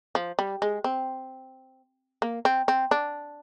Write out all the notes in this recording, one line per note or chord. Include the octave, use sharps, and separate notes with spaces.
F3
G3
G#3
C4
A#3
C4
C4
D4